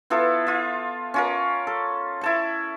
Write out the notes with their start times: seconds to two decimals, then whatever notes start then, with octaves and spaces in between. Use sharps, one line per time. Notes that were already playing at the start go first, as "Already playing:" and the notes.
0.10 B3 E4 F4 A4
0.47 F4 E5
1.14 C#4 F4 A#4
1.67 A4
2.21 E4 A5 C#6